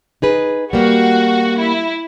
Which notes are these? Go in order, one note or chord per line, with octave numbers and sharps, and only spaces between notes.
D#4 G#4 B4
G3 A#3 F#4
E4